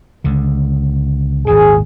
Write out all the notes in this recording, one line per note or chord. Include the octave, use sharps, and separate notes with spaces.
C#2 D3
G#1 D#2 A#2 G#4